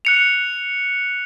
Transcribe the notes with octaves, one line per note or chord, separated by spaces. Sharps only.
F#6 C#7 F7